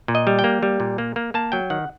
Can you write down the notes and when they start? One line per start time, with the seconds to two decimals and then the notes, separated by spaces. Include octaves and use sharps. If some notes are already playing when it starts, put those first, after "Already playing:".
0.08 A#2
0.15 D#5
0.27 G3
0.39 G5
0.44 A#3
0.63 G3
0.80 A#2
0.98 A#3
1.16 A#3
1.34 A#3 A5
1.52 F#3 G5
1.70 D#3 F#5